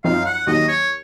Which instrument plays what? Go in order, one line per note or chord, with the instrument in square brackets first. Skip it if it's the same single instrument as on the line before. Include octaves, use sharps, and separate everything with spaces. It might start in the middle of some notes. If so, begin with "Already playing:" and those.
[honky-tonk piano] F#2 F3 C4 D#4 [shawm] F5
[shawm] F#5
[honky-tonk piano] D#2 D#3 F#3 [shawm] D#5
[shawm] C#5